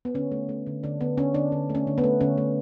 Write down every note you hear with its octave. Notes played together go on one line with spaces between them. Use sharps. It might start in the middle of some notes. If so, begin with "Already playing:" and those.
B3
D3 C#4
A3
A3
D3
D3 D4
D3 B3
D3 C#4
D3 D4
D3
A3
C#4
D3
B3
A3
D3 C#4
A3